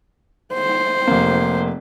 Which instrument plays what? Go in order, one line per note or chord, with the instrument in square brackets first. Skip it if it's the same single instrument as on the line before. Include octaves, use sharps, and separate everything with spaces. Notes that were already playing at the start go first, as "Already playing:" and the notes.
[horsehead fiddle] C5
[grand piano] F1 A#3